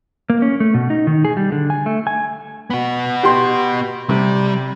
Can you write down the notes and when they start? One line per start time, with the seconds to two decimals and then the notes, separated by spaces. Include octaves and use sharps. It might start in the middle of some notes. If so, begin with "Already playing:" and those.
0.30 A#3
0.42 C#4
0.60 A3
0.74 B2
0.90 D#4
1.07 D#3
1.25 G#4
1.37 G3
1.52 D3
1.70 G#5
1.86 A3
2.07 G#5
2.70 B3 F#4
3.23 G4 C6
4.09 C3 G3